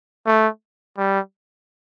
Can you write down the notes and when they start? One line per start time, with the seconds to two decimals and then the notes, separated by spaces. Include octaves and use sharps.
0.26 A3
0.98 G3